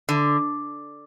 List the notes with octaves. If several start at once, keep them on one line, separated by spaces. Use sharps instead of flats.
D3